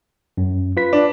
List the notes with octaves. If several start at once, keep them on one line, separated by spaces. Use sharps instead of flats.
F#2
F4 B4 B6
D4